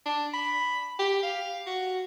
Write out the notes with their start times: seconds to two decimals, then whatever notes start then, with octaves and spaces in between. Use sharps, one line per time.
0.06 D4
0.34 B5
0.99 G4
1.23 F5
1.67 F#4